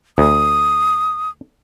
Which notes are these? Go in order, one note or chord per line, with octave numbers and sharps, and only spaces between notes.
D2 D#6